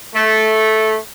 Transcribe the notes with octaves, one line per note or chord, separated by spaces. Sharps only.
A3